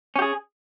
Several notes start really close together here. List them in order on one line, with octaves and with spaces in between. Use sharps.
C#4 G4 G#4